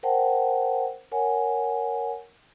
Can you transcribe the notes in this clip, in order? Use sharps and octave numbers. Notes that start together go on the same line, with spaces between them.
A#4 C5 F#5 G5 A5
A#4 C#5 F#5 G#5